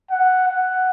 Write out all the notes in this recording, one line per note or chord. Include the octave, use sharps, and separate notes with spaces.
F#5
F#5